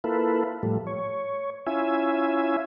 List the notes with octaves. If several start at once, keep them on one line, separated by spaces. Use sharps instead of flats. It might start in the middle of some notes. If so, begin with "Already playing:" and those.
A#3 E4 F4 A4 B4
A2 F3 G3 A3
C#5
C#4 E4 F4 E5 G#5